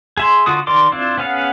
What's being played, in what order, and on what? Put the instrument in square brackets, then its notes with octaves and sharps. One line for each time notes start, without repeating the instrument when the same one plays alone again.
[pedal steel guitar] G#4 E5 C6
D3 F4 F#4 D#6
D#3 A#4 D5 C6 D6
C4 D4 E4 F4
B3 C#4 G#4 F5 F#5